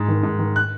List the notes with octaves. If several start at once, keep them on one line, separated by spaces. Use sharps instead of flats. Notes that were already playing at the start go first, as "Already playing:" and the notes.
Already playing: G#2
D#3
G#2
D#3
F#6